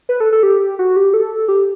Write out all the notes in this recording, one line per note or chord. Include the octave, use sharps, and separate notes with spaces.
B4
A4
A4
G4
F#4
G4
A4
G4